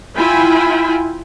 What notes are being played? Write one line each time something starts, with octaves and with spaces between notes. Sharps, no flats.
E4 F4 G5 G#5 B5